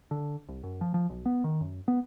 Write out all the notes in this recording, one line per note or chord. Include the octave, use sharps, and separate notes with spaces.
D3
C2
F#2
F3
F3
B1
B3
D#3
F#2
B3